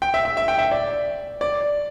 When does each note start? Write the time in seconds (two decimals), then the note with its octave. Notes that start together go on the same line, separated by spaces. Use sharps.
0.02 G5
0.14 E5
0.25 E5
0.37 E5
0.48 G5
0.59 E5
0.72 D5
1.41 D5